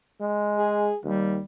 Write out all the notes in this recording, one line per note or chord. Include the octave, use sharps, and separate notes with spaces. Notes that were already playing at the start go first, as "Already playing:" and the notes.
G#3
G#4
D#2 G3